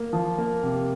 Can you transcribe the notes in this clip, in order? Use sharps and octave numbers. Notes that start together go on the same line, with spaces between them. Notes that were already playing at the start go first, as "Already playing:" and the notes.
Already playing: A#3
F3
A#3
C3